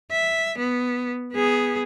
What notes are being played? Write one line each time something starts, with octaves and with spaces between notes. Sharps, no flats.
E5
B3
B3 G#4